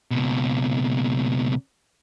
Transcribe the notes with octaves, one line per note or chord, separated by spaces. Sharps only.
C#2 B2